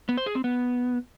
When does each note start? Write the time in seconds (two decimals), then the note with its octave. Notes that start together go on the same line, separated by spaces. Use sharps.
0.09 B3
0.17 C5
0.26 G#4
0.35 C4
0.44 B3